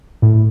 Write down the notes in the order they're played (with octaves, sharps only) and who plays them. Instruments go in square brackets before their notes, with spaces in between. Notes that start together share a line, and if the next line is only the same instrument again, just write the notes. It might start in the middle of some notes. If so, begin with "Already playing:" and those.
[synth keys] A2